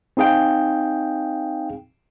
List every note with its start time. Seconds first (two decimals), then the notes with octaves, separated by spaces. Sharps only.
0.17 C4 D#4 G#4 F5 G5